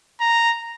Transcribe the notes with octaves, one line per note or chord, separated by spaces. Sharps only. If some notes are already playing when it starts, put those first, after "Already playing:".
A#5